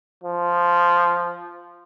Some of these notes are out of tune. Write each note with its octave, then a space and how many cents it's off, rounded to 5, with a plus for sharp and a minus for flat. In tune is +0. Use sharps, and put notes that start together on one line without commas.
F3 -5